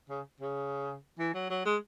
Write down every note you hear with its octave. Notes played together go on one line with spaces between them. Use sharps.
C#3
C#3
E3
F#3
F#3
G#3